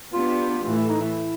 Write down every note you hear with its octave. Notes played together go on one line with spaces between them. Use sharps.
B3 D4 F4 G4
A2 E3 A3 F4
E4
D#4
E4